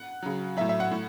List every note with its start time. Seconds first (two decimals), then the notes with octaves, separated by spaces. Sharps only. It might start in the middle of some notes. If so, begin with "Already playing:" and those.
Already playing: F#5
0.22 C#3 F#3
0.57 F#3 E5
0.61 A2
0.69 E5
0.80 F#5
0.91 A2